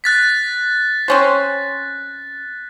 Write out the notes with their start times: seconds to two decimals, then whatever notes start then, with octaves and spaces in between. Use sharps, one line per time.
0.04 F#6 A6 B6
1.08 C4 C#4 C5